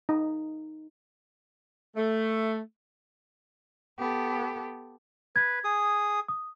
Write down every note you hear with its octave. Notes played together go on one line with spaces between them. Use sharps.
D#4
A3
B3 G4 A4
B4 G#6
G#4 D#6
D#6